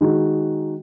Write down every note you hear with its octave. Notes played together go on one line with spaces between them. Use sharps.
D#3 G#3 D#4 F#4